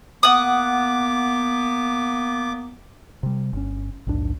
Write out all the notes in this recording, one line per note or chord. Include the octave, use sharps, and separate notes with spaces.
A#3 B3 F#5 D6 D#6
C3 G3
G1 C#4
A#1 D#2 G#2 D4